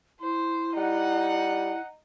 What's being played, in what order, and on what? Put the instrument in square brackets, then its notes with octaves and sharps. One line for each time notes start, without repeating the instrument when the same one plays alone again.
[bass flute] E4 [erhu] C5
[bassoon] G3 [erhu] D#4 [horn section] F#5